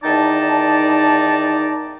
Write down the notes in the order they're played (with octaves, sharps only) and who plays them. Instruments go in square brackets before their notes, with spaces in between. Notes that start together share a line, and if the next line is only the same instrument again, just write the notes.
[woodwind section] E2 D#3 D#4 D5 A5